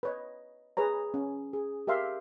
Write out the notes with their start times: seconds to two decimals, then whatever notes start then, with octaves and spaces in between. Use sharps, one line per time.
0.03 B4 C#5 D#5
0.77 G#4 B4 C#5 A#5
1.14 C#4
1.53 G#4
1.87 G4 A#4 E5 F5 C6